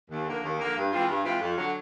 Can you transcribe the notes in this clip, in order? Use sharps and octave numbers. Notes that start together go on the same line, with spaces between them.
D#2
D3 F3 A#3
D#2
D3 F3 A#3
G2
E3 G#3 C4 F4
G2
E3 G#3 C4 F4
F2
D3 F#3